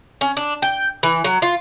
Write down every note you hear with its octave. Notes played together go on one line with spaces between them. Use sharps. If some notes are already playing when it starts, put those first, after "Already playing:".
C#4
D4
G5
E3
F#3
F4